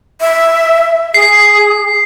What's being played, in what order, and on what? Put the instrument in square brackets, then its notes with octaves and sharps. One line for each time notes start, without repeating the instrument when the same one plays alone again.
[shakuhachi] E5
[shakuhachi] G#4 [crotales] C7